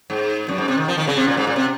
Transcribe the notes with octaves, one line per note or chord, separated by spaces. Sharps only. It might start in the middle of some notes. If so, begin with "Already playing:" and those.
G#2
F#2
G#2
C3
D#3
F3
D#3
C#3
C3
A#2
G#2
A#2
C3